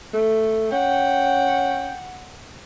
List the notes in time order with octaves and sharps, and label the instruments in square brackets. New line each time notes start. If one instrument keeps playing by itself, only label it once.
[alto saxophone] A3
[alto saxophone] C#4 [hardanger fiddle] F#5 [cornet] G5